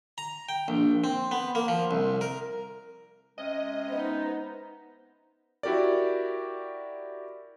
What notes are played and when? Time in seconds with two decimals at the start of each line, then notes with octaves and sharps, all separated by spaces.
0.18 A#5
0.49 G5
0.68 A#1
1.04 C4
1.31 B3
1.55 A#3
1.68 F3
1.91 C2
2.21 A#4
3.38 C3 G#3 C#4 D#5
3.89 B3 D#4 C5
5.63 E4 F#4 G4 A#4 D5